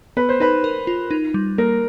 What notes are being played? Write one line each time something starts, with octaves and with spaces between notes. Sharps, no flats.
B3 B4
C5
D#4 B4
A#4
F4
D#4
G3
A#3 A#4